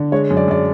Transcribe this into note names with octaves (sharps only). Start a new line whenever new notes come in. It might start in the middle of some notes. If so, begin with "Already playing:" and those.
Already playing: D3
G#3 C#5
F#2
D5
F#2 D5